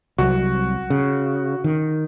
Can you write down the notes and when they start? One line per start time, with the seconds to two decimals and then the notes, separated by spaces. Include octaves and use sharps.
0.18 C2 F#3 F#4
0.90 C#3
1.64 D#3